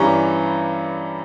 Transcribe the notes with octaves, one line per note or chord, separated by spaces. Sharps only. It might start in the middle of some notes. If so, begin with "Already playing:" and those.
Already playing: G2 E3 G3 C#4 A#5